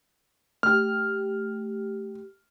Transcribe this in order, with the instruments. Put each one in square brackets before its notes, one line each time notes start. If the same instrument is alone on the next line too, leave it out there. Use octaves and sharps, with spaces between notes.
[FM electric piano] A3 G4 [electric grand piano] F6